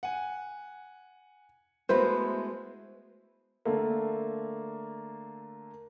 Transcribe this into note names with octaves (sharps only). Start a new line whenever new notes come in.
F#5 G#5
G#3 A3 B3 E4 F#4 B4 C5
D3 A3 A#3